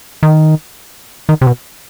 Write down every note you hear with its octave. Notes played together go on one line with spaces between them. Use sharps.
D#3
D#3
C3
B2